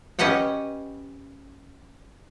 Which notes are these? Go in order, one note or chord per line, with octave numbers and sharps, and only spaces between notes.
C#4 G4 B4 D#5 F#5 G5